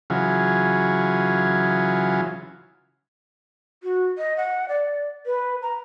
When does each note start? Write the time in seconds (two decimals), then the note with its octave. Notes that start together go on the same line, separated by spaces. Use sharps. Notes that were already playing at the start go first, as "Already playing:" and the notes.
0.10 C#3 E3 F#3 F4 G#4
3.83 F#4
4.18 D#5
4.37 F#5
4.69 D5
5.26 B4
5.62 A#5